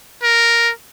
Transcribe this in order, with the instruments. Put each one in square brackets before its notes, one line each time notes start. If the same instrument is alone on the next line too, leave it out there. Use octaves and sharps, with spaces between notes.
[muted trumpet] A#4